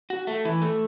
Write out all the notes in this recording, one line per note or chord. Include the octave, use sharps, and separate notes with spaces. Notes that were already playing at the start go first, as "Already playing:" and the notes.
F#4
A3
E3
A3